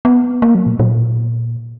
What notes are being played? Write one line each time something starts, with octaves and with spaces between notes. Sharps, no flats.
B3
A#3
F#3
A#2
A#2